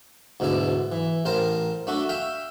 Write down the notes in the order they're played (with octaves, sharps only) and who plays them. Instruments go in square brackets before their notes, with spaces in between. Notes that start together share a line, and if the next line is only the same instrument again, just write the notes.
[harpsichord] D2 G#2 B2 E4 D5
E3
A1 A#4 C5 A5
A3 D4 F#4 A4
E5 F5 G5